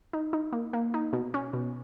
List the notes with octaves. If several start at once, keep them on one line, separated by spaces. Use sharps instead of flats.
D#4
D#4
A#3
A#3
D#4
B2
C#4
B2